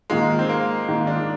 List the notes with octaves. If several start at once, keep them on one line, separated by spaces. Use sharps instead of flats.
G#2 D#3 G#3 A#3 F4
C4
A#3
G#2 D#3 A#3 F4
D4